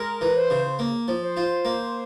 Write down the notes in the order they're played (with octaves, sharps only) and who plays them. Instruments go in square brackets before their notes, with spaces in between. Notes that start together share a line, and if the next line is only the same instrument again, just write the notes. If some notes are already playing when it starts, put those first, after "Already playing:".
Already playing: [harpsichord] G#3 [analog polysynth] A#4
[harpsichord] E3
[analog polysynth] C5
[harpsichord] C#3
A#3
F3
[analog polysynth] C5
[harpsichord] F4
A#3